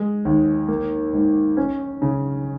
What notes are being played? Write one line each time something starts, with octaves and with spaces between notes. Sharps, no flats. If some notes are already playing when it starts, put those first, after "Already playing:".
Already playing: G#3
D#2
A#3
G#2
C#4
C#3